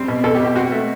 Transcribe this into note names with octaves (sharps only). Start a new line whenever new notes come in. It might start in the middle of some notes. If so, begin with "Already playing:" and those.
Already playing: G3 C4
B2
B2 A4
G4
B2
G4
C4 F#4
A3